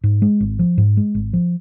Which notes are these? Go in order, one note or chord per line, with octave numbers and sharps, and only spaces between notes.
G#2
G#3
G#1
F3
G#2
G#3
G#1
F3